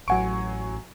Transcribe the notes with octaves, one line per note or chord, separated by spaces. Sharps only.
A1 F#3 F#5 G#5 C#6 D7